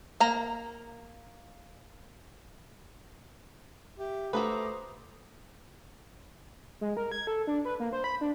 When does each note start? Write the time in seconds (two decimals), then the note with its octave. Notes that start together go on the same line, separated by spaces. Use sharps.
0.20 A#3 A#5
3.98 G4 E5
4.33 A3 F#4 A4 B4 C5 A#5 D6 D#6
6.81 G#3
6.97 A#4
7.12 G#6
7.27 A4
7.47 D4
7.65 B4
7.80 A#3
7.93 C5
8.04 B5
8.21 D4